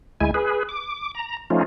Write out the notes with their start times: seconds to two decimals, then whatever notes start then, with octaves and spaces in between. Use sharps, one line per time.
0.21 D2 G#3 E4 G#5
0.34 G#4 B4
0.69 D6
1.15 A#5
1.50 F3 A3 C#4 D#4 F4